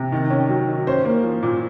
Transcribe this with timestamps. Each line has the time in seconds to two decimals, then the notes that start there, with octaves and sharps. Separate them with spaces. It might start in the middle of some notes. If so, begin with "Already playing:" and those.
Already playing: C3
0.12 D#3
0.30 C#4
0.49 F#3
0.68 D#3
0.87 C#4 C5
1.05 A#3
1.23 F3
1.42 A#2